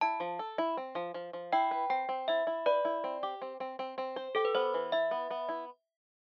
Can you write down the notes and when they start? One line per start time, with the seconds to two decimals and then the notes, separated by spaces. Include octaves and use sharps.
0.01 E4 A5
0.20 F3
0.39 A4
0.58 E4
0.77 C4
0.95 F3
1.14 F3
1.33 F3
1.53 E4 G5
1.71 B4
1.90 C4 G5
2.09 C4
2.28 E4 E5
2.47 E4
2.66 B4 D5
2.85 E4
3.04 C4
3.23 G4
3.42 C4
3.60 C4
3.79 C4
3.98 C4
4.16 C5
4.35 G4 A4
4.45 B4
4.55 B3 C5
4.74 E3
4.92 E4 E5
5.11 B3
5.31 B3
5.49 E4